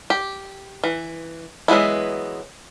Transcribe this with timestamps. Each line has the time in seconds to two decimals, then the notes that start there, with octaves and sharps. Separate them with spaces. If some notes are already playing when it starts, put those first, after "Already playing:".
0.10 G4
0.84 E3
1.68 E3 F#3 G#3 B3 E4